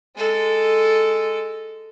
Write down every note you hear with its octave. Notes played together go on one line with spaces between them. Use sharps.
G#3 A4